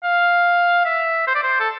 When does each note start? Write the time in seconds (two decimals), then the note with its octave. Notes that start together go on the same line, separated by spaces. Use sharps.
0.03 F5
0.85 E5
1.27 C5
1.35 D5
1.43 C5
1.60 A4